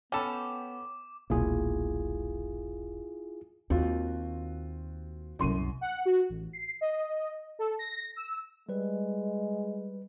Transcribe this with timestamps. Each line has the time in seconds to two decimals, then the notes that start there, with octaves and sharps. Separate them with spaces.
0.12 B3 C#4 A4 G5 B5 D6 E7
1.30 E1 B1 A#2 E4 F4 G#4
3.70 D#2 C4 F4 F#4
5.39 C2 F#2 B2 C6 D#7
5.81 F#5
6.05 F#4
6.29 A1
6.53 C7
6.81 D#5
7.59 A4
7.79 A#6
8.16 E6
8.69 G3 G#3 B4